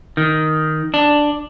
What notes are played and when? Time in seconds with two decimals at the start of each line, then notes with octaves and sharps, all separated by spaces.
0.17 D#3
0.94 D4